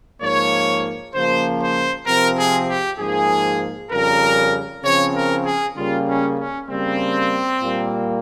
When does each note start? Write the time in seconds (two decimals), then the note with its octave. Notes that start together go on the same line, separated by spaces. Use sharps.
0.21 G#2 F3 A#3 C#5
1.14 C#3 F3 A#3 C5
1.60 C5
2.06 C3 F3 C4 A#4
2.37 G#4
2.68 G4
2.99 G#2 F3 A#3 G#4
3.91 F2 C#3 G3 A#4
4.83 C#3 F3 C4 C#5
5.14 A#4
5.44 G#4
5.75 C#3 G3 A#3 F4
6.06 C#4
6.37 C#4
6.68 C#3 G3 A#3 C4
7.60 A#2 G3 A#3